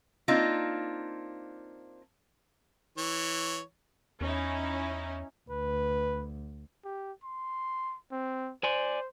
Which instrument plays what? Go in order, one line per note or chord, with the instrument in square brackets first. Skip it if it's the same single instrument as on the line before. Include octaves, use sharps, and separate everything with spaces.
[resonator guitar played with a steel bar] A#3 C4 D4 D#4 F4
[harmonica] E3 C#5
[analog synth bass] E2 [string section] C#4 D#4 E4
[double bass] D2 [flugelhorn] B4
[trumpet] G4
C6
C4
[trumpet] C5 [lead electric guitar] D5 G#5